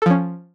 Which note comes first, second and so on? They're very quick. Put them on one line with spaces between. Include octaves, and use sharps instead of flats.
A4 F3 C#4